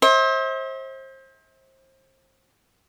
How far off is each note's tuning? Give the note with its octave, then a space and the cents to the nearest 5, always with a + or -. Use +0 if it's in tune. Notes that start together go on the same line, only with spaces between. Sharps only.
C5 +30 E5 -40